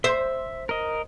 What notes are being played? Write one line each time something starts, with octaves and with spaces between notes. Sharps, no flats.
C5 E5
A#4 D#5